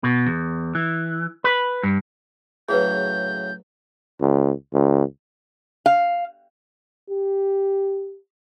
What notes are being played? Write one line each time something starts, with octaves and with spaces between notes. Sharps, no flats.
B2
E2
E3
B4
G2
A2 C#3 F#3 G#4 B4 G6
C#2
C#2
F5
G4